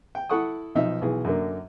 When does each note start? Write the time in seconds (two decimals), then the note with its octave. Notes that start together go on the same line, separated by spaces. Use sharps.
0.15 G5
0.29 E4 A4 F#5 C#6 D#6
0.75 B1 F3 D#4 E5
1.02 B1 E3 G#4
1.25 F#2 D3 A#3